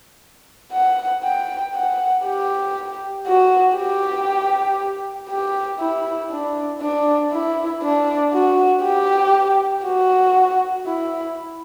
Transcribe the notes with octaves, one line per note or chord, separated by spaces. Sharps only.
F#5
G5
F#5
G4
F#4
G4
G4
E4
D4
D4
E4
D4
F#4
G4
F#4
E4